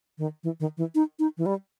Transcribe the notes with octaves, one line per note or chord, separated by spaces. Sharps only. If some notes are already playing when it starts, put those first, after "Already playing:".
D#3
E3
D#3
E3
D#4
D#4
E3
G3